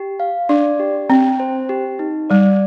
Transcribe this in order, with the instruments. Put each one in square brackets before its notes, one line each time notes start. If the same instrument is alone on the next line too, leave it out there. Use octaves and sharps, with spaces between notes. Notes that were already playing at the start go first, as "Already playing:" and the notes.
Already playing: [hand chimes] G4
F5
[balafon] D4 [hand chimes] D5
[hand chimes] G4
[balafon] C4 [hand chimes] G5
[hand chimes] C5
G4
D#4
[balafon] G3 [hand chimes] D5